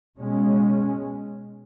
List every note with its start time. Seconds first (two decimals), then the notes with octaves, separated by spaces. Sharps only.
0.18 B2 G#3 C#4